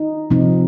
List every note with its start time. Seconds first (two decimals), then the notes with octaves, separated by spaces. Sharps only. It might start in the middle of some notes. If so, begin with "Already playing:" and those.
Already playing: D#4
0.31 C3 F3 C4 D#4